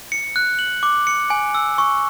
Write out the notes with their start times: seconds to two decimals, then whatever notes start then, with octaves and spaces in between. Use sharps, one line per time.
0.12 C#7
0.36 F#6
0.59 F#7
0.83 D6
1.07 C#7
1.30 G#5
1.55 E6
1.78 C#6